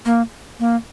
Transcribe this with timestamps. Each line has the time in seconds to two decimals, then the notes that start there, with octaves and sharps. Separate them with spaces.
0.06 A#3
0.60 A#3